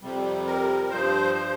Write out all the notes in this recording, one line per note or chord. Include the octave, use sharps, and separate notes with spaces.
F2 C3 G3
A#4
G2 F3 C5
C5